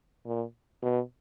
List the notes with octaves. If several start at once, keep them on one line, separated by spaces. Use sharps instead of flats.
A#2
B2